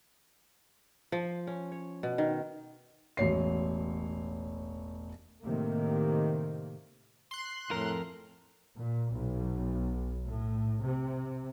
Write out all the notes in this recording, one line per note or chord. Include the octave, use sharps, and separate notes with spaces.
F3
C#4
C#5
B2
D#3
E1 A1 C#5 C7
A2 C3 D#3 A#3
C6 F#6
F2 A2 A#4
A#2
B1
A2
C3